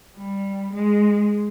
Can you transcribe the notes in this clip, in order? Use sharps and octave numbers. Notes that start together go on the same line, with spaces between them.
G3
G#3